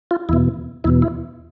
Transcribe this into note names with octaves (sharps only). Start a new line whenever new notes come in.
F4
E2 B2 E4
E2 B2 E4
E4